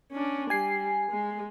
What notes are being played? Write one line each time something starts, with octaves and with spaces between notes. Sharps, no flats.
C#4 D4
G3 G#5 C7
G#3